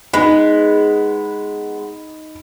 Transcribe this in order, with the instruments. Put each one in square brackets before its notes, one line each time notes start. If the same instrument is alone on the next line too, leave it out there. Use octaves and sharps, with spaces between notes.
[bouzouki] G#3 B3 [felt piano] D#4 B5